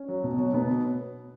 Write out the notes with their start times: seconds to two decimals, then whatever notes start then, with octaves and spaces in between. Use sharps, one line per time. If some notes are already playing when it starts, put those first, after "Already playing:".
Already playing: C#4
0.08 F#3
0.24 B2
0.38 F#3
0.53 B2 B3